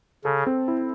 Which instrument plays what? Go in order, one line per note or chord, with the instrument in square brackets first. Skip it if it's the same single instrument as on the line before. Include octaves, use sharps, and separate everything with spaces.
[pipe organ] C#3 [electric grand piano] A4
[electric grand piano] C4
E4